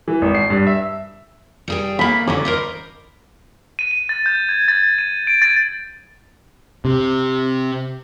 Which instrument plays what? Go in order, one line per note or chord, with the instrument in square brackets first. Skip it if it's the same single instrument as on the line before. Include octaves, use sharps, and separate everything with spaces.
[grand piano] E3
G#1
C7
G2
E5
[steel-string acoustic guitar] G3 G#4 G5
[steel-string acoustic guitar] A3 A#3 [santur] B5
[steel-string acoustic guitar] D3 F#3 C#4 [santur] D6
[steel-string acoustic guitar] A#4 C5 D#5
[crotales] D#7
D#7
A6
G6
G#6
A6
D#7
D7
A6
[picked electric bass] C3